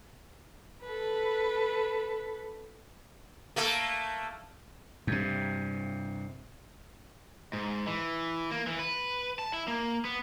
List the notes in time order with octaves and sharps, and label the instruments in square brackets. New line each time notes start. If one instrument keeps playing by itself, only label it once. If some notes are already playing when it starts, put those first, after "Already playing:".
[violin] A4 B4
[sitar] A3 A#3 A4
[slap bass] G2 C3
[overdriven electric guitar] G#2
E3
A#3
E3
B4
A5
E4
A#3
B3